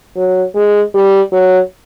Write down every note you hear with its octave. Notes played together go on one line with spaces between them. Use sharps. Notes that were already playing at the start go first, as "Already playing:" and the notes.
F#3
G#3
G3
F#3